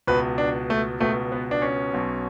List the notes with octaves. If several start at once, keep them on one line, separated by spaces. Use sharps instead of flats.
C#2 B2 B4
D4
A3
C#2 B2 A3
B3
D4
C#4
B1 B2